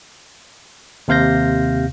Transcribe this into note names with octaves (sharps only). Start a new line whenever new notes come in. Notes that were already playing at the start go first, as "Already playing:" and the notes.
D#2 C3 F5 G6 A#6